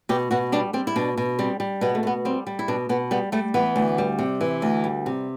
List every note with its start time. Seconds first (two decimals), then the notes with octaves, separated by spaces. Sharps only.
0.09 B2 G4
0.31 B2 F#4
0.52 G3 D4
0.73 G3 C4
0.87 E4
0.96 B2 D4
1.17 B2
1.39 G3 C4
1.60 G3
1.81 B2 B3
1.95 A3
2.03 B2 B3
2.25 G3 C4
2.47 G3
2.59 E4
2.68 B2 D4
2.89 B2 B3
3.11 G3 B3
3.32 G3 A3
3.54 E3 B3
3.76 D2
3.98 G3
4.19 C3
4.41 E3
4.62 D2
4.84 G3
5.06 C3